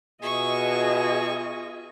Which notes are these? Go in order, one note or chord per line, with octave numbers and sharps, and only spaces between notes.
B2 F4 G#4 D#5 E5 C#6